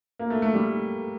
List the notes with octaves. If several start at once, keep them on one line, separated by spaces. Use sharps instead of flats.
A#3
A3
A3
G3